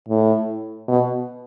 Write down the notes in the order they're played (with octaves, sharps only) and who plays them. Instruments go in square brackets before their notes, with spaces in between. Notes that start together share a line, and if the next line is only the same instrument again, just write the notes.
[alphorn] A2
B2